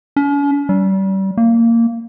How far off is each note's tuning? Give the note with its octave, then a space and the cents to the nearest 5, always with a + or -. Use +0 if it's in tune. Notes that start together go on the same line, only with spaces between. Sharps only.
C#4 +45
G3 -30
A#3 -15